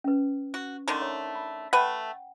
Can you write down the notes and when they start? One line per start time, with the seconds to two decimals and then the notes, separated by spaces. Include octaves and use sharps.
0.04 C#4 B4
0.54 F#4
0.88 D3 D#3 A3 A#5 C6
1.02 C#5
1.36 B5
1.73 A3 B4 F#5 G5